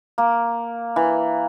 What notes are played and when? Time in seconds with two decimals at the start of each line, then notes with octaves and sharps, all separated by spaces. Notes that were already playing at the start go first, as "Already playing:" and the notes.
0.18 A#3
0.96 E3